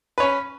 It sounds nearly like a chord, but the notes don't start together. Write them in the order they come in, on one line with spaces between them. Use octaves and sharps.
B4 C#5 C#4